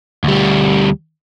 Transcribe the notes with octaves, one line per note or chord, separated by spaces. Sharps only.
D2 G3